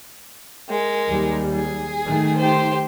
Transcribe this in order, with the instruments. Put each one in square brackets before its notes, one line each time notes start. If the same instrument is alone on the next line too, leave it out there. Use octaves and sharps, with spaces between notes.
[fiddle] G#3 A#4
[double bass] D#2 G3
[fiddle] G#4
[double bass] D#3 A3
[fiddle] G4 C5